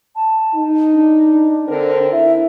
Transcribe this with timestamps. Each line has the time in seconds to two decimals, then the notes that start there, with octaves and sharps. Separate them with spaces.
0.16 A5
0.54 D#4
0.94 D4
1.68 D3 C4 A#4
2.12 E4 E5